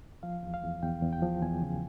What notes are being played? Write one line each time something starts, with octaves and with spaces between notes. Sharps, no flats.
F3 F5
E2
F5
E2
E2 G5
E2
G5
F3
E2 G#5
C#3